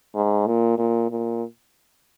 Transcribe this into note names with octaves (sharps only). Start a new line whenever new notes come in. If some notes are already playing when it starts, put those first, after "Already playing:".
G#2
A#2
A#2
A#2